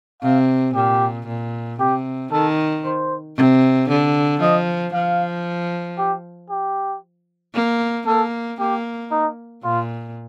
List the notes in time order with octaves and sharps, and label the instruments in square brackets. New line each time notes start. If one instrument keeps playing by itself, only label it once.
[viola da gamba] C3 [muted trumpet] F5
[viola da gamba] A#2 [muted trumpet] G4
[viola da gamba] A#2
[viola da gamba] C3 [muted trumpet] G4
[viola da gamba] D#3 [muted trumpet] A4
[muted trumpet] C5
[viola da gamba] C3
D3
[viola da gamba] F3 [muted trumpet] D#5
[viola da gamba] F3 [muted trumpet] F5
[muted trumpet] G4
G4
[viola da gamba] A#3
[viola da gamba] A#3 [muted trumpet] A4
[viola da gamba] A#3 [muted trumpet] G4
[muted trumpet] D#4
[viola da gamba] A#2 [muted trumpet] F4